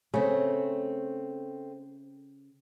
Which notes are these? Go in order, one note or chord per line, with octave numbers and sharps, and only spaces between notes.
C#3 A3 C4